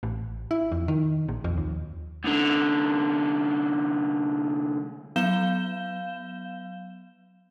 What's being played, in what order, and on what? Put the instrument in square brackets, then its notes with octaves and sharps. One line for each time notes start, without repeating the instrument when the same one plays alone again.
[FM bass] A1
E4
F2
D#3
A#1
F2
D#2
[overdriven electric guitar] C2 D3
[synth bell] F#3 B3 F5 G6 E7 G7